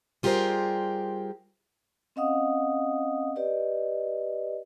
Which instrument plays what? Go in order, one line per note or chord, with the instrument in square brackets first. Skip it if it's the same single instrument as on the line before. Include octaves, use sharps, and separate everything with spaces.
[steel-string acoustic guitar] G3 F4 G4 G#4 A#4 C5
[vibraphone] C4 C#4 D#5 F5 F#5 D#6
G4 B4 D5 D#5